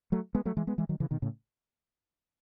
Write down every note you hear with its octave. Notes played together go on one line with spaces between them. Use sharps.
F#3 A3
G#3 B3
F#3 A3
E3 G#3
G#3 B3
E3 G#3
D#3 F#3
C#3 E3
B2 D#3
A2 C#3